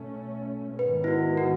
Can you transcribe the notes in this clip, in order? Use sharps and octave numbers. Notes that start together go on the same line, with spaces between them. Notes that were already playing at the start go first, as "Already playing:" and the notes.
Already playing: B2 A3 C#4
G#2 D#3 G#3 B3 B4
E4
F#4
F#4